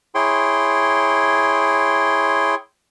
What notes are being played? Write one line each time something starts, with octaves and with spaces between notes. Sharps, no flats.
E4 G#4 C#5 G5 C6